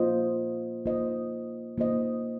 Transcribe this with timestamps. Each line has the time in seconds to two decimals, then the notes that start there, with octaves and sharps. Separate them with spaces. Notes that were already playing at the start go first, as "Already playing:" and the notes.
Already playing: A#3 F4 C5 D#5
0.86 A#3 F4 C5 D#5
1.78 A#3 F4 C5 D#5